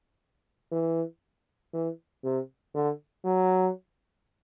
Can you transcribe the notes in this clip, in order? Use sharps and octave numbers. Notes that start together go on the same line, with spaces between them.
E3
E3
C3
D3
F#3